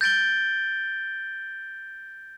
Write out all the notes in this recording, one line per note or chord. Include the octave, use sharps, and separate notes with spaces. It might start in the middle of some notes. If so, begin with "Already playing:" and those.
G6 A6 D7 G7